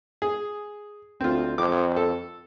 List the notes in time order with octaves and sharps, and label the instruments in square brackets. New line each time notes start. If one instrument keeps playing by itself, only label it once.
[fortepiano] G#4
[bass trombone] D2 [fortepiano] C4 F4
[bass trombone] F2 [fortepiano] D6
[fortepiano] A4